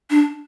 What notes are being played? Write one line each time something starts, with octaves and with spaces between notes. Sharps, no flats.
D4